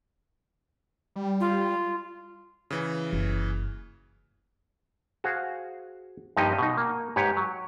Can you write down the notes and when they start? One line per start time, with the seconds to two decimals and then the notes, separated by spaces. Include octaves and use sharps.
1.16 G3
1.40 F4
2.70 C#3 E3
3.13 F#1
5.24 F#4 G#4 C5 F5
6.37 G2 F3 A#3 D#4 G4 D#5
6.58 B2 D#4
6.77 A#3
7.16 G#2 G4 B4 C#5
7.37 F#3